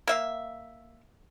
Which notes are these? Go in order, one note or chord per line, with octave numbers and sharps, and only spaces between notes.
A#3 E5 F5